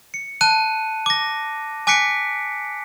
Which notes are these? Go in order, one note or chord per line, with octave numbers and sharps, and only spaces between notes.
C#7
A5 F#6 D#7
D6 A#6
G#5 D6 F#6 B6 C#7 D7